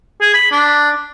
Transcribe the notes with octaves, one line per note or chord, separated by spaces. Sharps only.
G#4
B5
D4